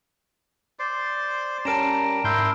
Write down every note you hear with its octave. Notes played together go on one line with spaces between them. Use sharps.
C5 D5 C6
G3 C#4 A#4 A5 A#5 D7 E7
G#2 E4 A#4 C6 G6